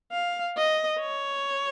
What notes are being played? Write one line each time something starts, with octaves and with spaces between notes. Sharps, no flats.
F5
D#5
C#5